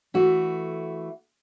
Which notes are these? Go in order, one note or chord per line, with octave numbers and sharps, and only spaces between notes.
E3 A3 F#4